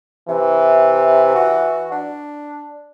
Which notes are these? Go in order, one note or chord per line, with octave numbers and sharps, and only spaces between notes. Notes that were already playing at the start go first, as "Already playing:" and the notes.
C3 E3
F#4
D4